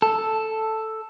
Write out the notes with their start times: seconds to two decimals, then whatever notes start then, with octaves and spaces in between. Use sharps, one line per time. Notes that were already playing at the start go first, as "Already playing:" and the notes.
0.02 A4